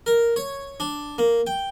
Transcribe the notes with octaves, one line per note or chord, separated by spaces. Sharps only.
A#4
C#5
D4
A#3
G5